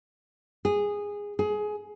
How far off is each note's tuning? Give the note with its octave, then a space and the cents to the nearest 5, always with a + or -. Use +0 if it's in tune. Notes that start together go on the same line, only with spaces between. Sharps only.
G#4 -15
G#4 +20